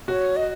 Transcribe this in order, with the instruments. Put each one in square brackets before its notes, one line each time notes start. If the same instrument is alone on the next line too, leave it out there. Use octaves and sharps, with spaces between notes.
[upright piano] F#4 [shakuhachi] C#5
[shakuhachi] D#5